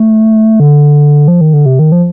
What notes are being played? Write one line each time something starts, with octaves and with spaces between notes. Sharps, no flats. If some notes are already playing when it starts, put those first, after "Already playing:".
Already playing: A3
D3
F3
D#3
D3
C3
D#3
F3